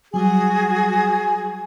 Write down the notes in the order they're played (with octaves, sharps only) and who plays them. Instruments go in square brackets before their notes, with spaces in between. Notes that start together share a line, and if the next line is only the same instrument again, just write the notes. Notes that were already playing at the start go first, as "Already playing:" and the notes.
[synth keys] F#3 G3 [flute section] F#4 G#4 [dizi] G#5